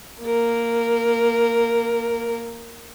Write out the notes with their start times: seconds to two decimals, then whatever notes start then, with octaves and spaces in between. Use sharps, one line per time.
0.23 A#3 A#4